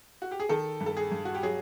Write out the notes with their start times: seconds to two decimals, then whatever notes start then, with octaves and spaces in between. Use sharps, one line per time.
0.22 F#4
0.31 G4
0.40 G#4
0.49 D#3 A4
0.81 G2
0.86 A4
0.97 G#4
1.11 G2
1.25 F#4
1.35 G4
1.43 F#3 G#4